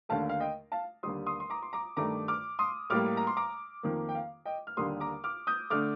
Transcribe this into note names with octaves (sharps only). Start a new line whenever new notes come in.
D#2 D3 A3 F5 A5
F5
D#5 G5
F5 A5
D#2 D3 G3 C6 D#6
C6 D#6
C6
A#5 D6
C6
A#5 D6
G2 D#3 A3 A#5 D6
D6 F6
C6 D#6
A2 G3 A#3 D6 F6
A#5
C6
A#5 D6
F2 D#3 A#3
G5
F5
D#5 G5
F6
D#2 D3 G3 A#3 C6 D#6
A#5 D6
D6 F6
D#6 G6
D3 A3 D6 F6